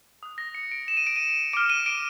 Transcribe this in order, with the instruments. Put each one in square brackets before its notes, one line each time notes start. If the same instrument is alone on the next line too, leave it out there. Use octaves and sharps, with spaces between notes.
[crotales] D#6 F#6
A#6
C#7
D7
E7
D#7
D7
D#7
D6 F6 D7
D#7
D7